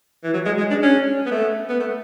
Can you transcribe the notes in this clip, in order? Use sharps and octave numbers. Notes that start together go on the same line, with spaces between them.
E3
F#3
G#3
G#3
D4
C#4
B3
A3
B3
A3